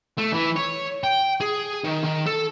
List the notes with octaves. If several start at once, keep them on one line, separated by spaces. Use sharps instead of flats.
A3
E3
C#5
G5
G#4
D#3
D#3
A4